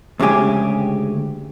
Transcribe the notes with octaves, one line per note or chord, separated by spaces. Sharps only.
D2 C#3 G#3 G4 G#5